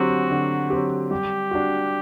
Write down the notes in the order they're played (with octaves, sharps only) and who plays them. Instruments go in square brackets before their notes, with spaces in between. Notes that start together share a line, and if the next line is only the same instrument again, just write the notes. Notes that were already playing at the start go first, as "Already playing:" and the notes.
Already playing: [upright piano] D3 F#3 C4 G4 [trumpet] F#4
[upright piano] D3
F#3 C4 G4
[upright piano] G3 [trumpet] G4
[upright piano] D4 F#4